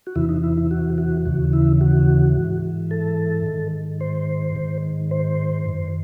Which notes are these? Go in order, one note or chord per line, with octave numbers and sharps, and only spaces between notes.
F#4
E2 C3 E3 E4
D#4
E4
E4
F#4
F#4
D#2 C#3 E3 F#4
E4
F#4
G#2 E3
A4
G#2 D#3
C5
G#2 D#3
C5
F#2 D#3